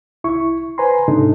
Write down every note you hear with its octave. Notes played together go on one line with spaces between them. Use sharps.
C2 E4 C#6
B4 C5 G#5 A#5 C6
G#2 C3 D4 D#4 A4